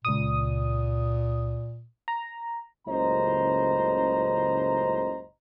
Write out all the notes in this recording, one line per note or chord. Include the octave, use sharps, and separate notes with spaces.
C#2 A#2 D#6
A#5
F#1 C#2 A2 C5 D#5 A#5